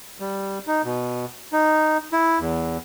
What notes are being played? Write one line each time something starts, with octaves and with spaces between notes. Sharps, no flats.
G3
D#4
B2
D#4
E4
E2